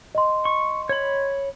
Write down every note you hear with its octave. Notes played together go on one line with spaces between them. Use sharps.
D#5 C6
C#6
C#5 B5